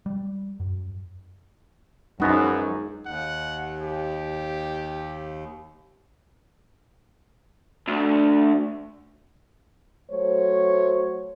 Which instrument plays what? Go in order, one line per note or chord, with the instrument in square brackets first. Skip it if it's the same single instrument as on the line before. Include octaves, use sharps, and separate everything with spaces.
[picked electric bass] G3
F#2
[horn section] F#2 [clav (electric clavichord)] F3 B3 F#4 [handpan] G#3 D#4
[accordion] D#2 [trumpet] F#5
[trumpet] G4
[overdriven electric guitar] D2
[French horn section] F#3 A3 C5 C#5